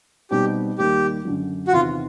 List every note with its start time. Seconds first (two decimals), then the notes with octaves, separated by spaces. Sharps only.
0.31 B2 G3 C4 D#4 G4
0.78 D#2 D#3 G3 A#3 G4
1.25 F#2 D3 F#3
1.68 F#4
1.73 E2 C3 D#3 F4